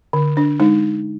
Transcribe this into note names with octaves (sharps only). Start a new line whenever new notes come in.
D3
D4
G#3 D#4